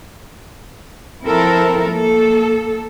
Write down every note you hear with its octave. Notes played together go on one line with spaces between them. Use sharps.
F3 C4 E4 A4 A#4
A#3 A4